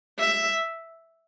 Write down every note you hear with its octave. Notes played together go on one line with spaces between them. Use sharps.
E5